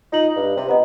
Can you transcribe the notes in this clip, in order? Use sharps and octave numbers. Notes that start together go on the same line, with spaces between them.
D#4 F4 F#7
G2
C3
B3 D#5 A#5